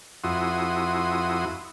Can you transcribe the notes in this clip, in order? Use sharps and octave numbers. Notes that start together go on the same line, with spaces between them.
F2 E4 F#4 C6 D#6